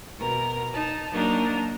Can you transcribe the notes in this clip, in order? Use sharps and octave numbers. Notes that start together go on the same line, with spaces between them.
B2 A#4
D#4 A5
F#3 A#3 D4 D#4 A#4